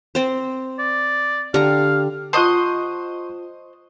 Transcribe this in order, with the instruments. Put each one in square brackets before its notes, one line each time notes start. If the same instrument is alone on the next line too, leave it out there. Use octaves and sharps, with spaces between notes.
[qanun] C4 C5
[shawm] D5
[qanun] D3 A#5 [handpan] G4 [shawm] F5
[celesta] F4 F#5 A5 [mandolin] C5 D#5 [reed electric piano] C6 C#6 F#6